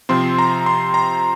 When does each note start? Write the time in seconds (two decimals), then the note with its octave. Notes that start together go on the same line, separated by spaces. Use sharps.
0.09 C3 F3 C4 C6
0.39 A#5
0.66 C6
0.94 A#5